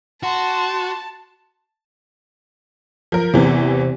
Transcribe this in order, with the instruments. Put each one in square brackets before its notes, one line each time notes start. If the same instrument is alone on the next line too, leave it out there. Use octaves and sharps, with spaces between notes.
[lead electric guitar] F#4 [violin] A5 [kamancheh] C6
[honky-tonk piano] F3 A#4
[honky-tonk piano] E2 E3 [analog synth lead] C3